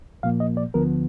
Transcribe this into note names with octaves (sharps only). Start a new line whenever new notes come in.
A#2 F3 A#3 F5
D#5
D5
D2 D3 F3 B3 A#4